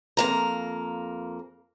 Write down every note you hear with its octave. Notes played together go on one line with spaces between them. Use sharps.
F2 A#3 A#5